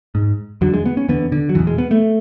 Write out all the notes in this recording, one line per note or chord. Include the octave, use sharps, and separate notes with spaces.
G#2
E2 D3 F#3
G#3
B3
C#4
E2 D3 B3
D3
F#3
E2 B2 E3
G#3
B3
A3